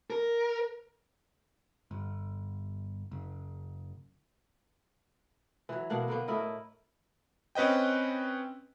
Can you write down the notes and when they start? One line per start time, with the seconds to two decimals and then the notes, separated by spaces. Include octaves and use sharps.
0.10 A#4
1.91 G1
3.12 F#1
5.69 E3 F#3
5.90 B2 A#3 D4 F#5
6.08 D3 A#3 B3
6.28 A2 E4 A#4 D#5
7.55 C4 C#4 B4 D#5 G5